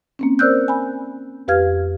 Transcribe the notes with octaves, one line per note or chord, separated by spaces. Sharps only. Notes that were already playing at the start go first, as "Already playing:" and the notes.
A#3 C4 C#4
A#4 C5 D5 E6 F#6 G6
G#5 B5
F2 G4 B4 F5 F6 G#6